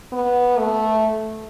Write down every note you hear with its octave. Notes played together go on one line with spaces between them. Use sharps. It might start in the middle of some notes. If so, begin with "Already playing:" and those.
B3
A3